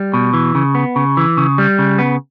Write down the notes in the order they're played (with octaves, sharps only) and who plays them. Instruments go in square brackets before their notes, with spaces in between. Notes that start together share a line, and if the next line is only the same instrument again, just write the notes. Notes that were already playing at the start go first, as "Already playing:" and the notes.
Already playing: [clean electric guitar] G3
B2
E3
C#3
B3
C#3
E3
C#3
G3
C#3
B3